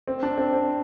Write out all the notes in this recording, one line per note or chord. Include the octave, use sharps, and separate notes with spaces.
C4
D4
C4
C4